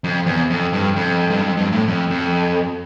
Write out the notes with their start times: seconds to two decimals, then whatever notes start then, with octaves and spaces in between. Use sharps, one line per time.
0.04 F2
0.26 E2
0.50 F2
0.73 G2
0.96 F2
1.30 G2
1.42 F2
1.57 G2
1.72 A2
1.88 F2
2.10 F2